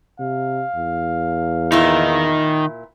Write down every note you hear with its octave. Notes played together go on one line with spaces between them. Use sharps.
C3 F5
E2
A#2 D#3 D#4 E4